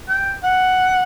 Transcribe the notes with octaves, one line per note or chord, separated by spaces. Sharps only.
G5
F#5